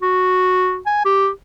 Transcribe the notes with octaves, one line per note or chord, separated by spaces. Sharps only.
F#4
G#5
G4